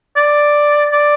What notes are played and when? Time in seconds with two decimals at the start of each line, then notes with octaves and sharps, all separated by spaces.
0.16 D5
0.92 D5